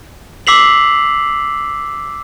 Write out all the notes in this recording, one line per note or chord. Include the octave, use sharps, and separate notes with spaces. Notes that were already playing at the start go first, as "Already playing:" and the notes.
D6 E6 B6 C7 F7 F#7